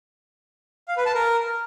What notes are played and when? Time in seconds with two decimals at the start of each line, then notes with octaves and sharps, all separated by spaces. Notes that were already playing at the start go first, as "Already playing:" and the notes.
0.88 F5
0.97 B4
1.06 A5
1.14 A#4